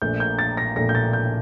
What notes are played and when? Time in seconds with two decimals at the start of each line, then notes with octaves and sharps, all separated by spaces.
0.02 A#1 A#2 A3 G6
0.20 G6
0.39 A6
0.57 A#6
0.76 A#1 A#2 A3 A#6
0.89 G6
0.95 A6
1.13 G6